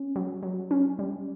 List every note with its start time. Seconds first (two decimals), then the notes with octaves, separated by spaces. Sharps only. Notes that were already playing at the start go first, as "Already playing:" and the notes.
Already playing: C#4
0.16 F#3
0.43 F#3
0.71 C#4
0.99 G3